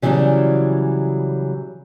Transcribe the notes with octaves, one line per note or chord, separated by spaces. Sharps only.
C#3 E3 F#3 G3 C#4 D4